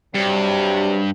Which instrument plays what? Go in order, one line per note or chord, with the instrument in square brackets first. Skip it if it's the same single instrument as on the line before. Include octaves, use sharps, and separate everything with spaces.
[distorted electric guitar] G2 [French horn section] C3 F#3 G3